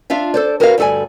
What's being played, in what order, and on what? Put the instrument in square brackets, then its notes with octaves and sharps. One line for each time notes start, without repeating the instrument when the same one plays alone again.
[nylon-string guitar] D4 F4 E5 F5
A4 C5 D5
F#4 A#4 B4 C#5 E5 F5
D2 G2 A4 D5 G#5